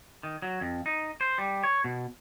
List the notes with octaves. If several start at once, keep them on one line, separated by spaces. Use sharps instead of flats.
D#3
F#3
F2
D#4
C5
G3
C#5
B2